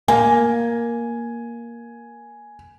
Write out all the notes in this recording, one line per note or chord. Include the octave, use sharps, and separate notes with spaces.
A#3 G#5